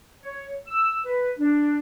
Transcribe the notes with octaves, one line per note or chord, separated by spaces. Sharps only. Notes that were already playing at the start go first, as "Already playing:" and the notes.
C#5
E6
B4
D4